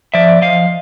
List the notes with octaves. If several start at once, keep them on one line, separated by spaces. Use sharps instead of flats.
F3 D5 E5
F3 D#5 F5